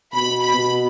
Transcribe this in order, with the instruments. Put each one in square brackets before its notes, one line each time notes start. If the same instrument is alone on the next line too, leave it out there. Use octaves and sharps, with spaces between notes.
[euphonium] B2 [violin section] B5
[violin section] B5
[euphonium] B2